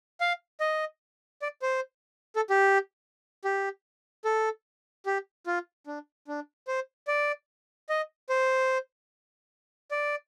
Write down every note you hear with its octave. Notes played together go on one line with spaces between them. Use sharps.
F5
D#5
D5
C5
A4
G4
G4
A4
G4
F4
D4
D4
C5
D5
D#5
C5
D5